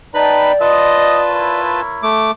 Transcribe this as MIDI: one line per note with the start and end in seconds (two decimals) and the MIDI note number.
0.14 0.52 63
0.14 0.52 71
0.14 1.61 74
0.14 0.52 79
0.14 0.52 81
0.14 0.52 83
0.61 1.81 65
0.61 1.81 71
0.61 1.20 72
0.61 1.20 75
0.61 1.81 81
1.28 2.15 64
1.28 2.15 70
1.28 2.15 73
2.03 2.31 57
2.03 2.31 86